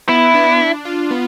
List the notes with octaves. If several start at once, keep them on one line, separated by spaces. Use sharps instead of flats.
B3 E4
D4
D4
F4
B3